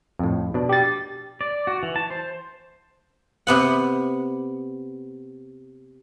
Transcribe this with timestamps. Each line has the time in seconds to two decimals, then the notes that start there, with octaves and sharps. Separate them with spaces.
0.19 F2 A2
0.54 B2 D4
0.69 G4 A6
1.41 D5
1.67 F#4
1.83 E3
1.96 A5
2.10 C5
3.47 C3 B3 F#5